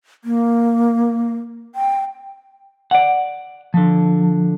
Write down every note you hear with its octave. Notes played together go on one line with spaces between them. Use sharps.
A#3
G5
D5 F#5
D3 F3